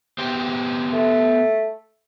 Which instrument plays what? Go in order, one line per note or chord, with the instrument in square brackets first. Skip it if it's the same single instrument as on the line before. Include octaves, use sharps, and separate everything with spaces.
[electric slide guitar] B3 G4 C5
[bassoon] A3